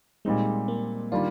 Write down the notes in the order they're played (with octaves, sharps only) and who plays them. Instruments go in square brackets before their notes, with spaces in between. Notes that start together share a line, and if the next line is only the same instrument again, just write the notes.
[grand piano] A#2 G3 C4 D#4 [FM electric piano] G#3
[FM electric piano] A#3
[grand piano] D#3 G3 A#3 F4 [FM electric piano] D4